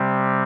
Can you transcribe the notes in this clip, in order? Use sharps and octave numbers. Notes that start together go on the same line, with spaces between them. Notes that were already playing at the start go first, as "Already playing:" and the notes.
Already playing: C3 G3 C4